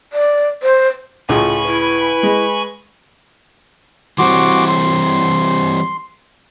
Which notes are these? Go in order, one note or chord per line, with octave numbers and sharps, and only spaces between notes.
D5
C5
C#2 A2 C#3 F4 G#5 B5 C#6
E4 B4
G#3
E3 G3 C4 F#4 C6 D6
C6